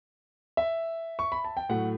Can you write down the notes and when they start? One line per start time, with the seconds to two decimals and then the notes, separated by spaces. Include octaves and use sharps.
0.57 E5
1.19 C#6
1.32 B5
1.44 A5
1.57 G5
1.69 A2 F#3 A3 F#5